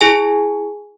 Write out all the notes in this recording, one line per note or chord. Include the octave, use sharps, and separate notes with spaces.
E4 G#4 G#5